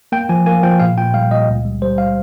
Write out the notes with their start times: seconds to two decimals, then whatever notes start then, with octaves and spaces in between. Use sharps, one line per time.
0.12 A#3 G5
0.29 F3 G#5
0.46 A#3 G#5
0.63 F3 G5
0.80 A#2 F5
0.97 A#2 G5
1.14 G3 F5
1.30 A#2 D#5
1.48 C#2
1.65 G3
1.82 G3 C5
1.98 F5